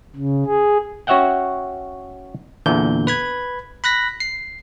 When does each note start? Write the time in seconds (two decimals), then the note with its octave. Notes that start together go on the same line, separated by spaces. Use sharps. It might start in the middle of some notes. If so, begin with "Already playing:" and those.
0.16 C#3
0.46 G#4
1.07 C#4 F#4 C#5 E5 F#5 G5
2.66 E2 A#2 D3 G6
3.07 B4 B5 G#6
3.84 B5 F#6 A#6 B6
4.20 C7